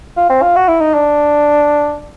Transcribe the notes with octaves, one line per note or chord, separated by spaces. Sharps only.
F4
C4
F4
F#4
E4
D#4
D4